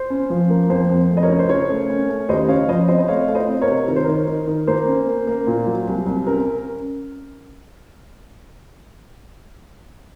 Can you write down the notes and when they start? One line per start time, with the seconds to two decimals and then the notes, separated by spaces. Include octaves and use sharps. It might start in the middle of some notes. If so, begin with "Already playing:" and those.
Already playing: C5
0.10 C#4
0.30 F3
0.50 A#3
0.70 F2 C5
0.90 F2
1.10 A3
1.17 D#5
1.23 A#4 C#5
1.29 C#3
1.39 C5
1.49 C#3 A#4 C#5
1.69 A3
1.89 C#4
2.09 A3
2.29 D#2 C5 D#5
2.48 C#3 C#5 F5
2.68 F3 C5 D#5
2.88 C4 C5 D#5
2.98 D#5
3.08 A3 C#5 F5
3.28 A3
3.35 C5 D#5
3.48 C4
3.62 A#4 C#5
3.68 C3
3.88 D#3 A#4
3.96 C5
4.04 D#3 A#4
4.28 D#3
4.48 D#3
4.67 A#3 C5
4.87 C#4
5.07 A#3
5.27 A#3
5.47 A#2
5.67 F#3
5.87 C2
6.06 C2
6.27 C#4 A#4